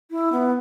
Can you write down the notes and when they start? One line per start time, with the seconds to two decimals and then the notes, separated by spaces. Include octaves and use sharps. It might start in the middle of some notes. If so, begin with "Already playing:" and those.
0.11 E4
0.32 B3